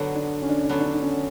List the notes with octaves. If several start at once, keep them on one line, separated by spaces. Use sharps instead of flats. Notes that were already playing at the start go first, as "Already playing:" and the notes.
Already playing: D3 F#3 B3
D4
C#4
D4
C#4
D4
D3 F#3 B3 C#4
D4
C#4
D4
C#4